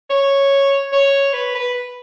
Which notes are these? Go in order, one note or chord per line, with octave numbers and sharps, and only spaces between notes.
C#5
C#5
B4
B4